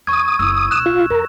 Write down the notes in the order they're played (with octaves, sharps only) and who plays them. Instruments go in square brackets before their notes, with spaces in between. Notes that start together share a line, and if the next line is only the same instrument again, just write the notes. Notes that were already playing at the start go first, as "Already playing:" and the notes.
[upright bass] E2 [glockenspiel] C#6 G#6 [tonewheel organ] D#6
[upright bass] F#1 E4 [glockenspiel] E6
[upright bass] D1 B1 [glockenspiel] F#6 E7
[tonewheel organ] F4
[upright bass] F2 [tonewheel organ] A#4